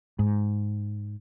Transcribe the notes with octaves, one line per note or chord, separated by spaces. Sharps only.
G#2